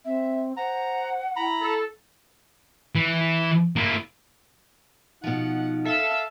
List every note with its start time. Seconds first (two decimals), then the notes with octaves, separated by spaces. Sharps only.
0.05 C4 E5
0.57 C5 F#5 A#5
1.36 E4 A#5 B5
1.61 A4
2.95 E3
3.76 A#3 E4
5.24 B2 F3 D#4 F#5
5.85 A4 E5 F5 E6